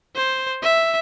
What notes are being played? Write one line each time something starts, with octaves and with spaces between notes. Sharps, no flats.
C5
E5